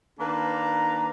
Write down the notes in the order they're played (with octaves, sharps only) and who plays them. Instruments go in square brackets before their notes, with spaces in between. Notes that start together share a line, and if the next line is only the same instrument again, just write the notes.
[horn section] D#3 A#3 D4 B4 A#5